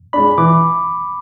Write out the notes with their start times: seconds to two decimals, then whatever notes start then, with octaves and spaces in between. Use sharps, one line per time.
0.13 G#3 D4 B5
0.38 E3 D6